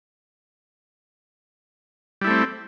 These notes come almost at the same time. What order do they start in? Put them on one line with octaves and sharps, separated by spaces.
G3 E4 A3 C4